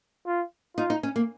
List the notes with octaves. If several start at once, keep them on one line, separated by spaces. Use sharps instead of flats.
F4
D#4 F4
D#4
C#4
A#3